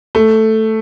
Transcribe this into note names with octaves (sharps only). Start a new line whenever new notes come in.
A3